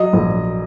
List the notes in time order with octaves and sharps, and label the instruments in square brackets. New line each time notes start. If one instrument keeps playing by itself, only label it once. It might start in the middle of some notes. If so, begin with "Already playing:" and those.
Already playing: [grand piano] F#3 D#5
A#1